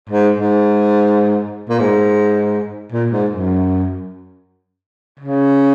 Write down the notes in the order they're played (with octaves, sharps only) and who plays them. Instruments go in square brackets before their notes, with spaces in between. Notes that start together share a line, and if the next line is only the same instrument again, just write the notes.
[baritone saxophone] G#2
G#2
A#2
G#2
A#2
G#2
F#2
C#3